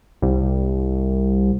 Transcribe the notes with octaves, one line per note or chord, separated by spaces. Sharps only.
C2